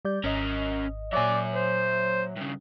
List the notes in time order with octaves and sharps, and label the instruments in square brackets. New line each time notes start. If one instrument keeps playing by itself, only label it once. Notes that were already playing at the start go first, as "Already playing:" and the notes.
[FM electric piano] G3 D5 G6
[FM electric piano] G#1 D#5 [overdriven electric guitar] C#4 A#4
[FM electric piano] A#2 C#5 E5 [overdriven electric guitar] F#3 G#5 [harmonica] D5
[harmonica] C5
[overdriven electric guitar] G2 C#3